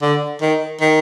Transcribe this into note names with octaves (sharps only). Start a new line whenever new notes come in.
D3
D#3
D#3